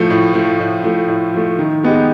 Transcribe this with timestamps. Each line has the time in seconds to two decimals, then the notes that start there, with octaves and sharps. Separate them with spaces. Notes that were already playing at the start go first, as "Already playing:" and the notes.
Already playing: A2 F3 A3
0.10 A2
0.34 F3 A3
0.60 A2
0.84 F3 A3
1.08 A2
1.34 F3 A3
1.59 D#3
1.83 G#3 B3 D#4 G4